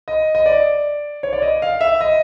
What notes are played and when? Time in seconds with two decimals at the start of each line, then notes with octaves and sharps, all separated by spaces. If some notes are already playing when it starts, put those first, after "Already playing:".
0.08 D#5
0.35 D#5
0.46 D5
1.23 C#5
1.33 D5
1.42 D#5
1.62 F5
1.81 E5
2.01 D#5